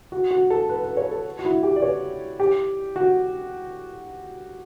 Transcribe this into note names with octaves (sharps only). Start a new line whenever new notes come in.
F#4
F#4
A4
B4
B4
C#5
A4
F#4
E4
G4
D5
C#5
G4
F#4